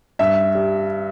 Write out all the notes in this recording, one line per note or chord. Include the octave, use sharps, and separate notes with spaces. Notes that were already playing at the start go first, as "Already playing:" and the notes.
G2 E5
G3